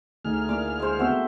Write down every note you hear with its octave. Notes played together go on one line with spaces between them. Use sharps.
D2 A3 D#4 G#4 F6
A#3 D4 E4 D6
G#3 C5
B3 C4 F#4 A4 C5 E5